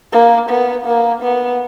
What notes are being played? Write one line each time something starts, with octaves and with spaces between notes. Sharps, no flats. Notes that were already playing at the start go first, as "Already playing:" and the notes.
A#3
B3
A#3
B3